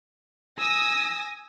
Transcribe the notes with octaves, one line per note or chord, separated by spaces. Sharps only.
G#5 D#6 E6 A#6